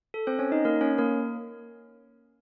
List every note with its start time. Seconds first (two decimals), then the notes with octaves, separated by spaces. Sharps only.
0.14 A4
0.27 C4 C5
0.39 C#4 C#5
0.52 D#4 D#5
0.65 A#3 A#4
0.81 C#4 C#5
0.98 A#3 A#4